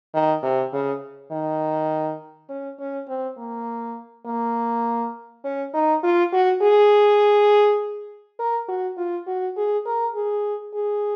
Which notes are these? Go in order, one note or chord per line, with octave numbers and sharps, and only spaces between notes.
D#3
C3
C#3
D#3
C#4
C#4
C4
A#3
A#3
C#4
D#4
F4
F#4
G#4
A#4
F#4
F4
F#4
G#4
A#4
G#4
G#4